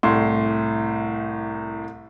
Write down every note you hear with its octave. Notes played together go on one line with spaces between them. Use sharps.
C2 A2 C6